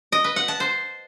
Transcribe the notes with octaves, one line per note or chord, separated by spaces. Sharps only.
D#5
B4
F#5
A5
C5